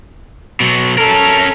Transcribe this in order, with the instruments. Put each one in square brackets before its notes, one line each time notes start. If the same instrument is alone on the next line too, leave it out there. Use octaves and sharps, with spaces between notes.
[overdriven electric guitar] B2 F#3
[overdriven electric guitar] C#4 A#4 [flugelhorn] A4